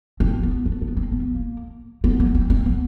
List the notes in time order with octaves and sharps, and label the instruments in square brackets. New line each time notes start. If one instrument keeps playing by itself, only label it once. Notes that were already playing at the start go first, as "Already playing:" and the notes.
[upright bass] C4
B3
B3
B3
C4
B3
A#3
B3
B3
C4
C4
B3